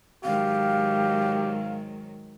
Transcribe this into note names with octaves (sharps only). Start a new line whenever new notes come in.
G#2 D#3 F#3 G4 F5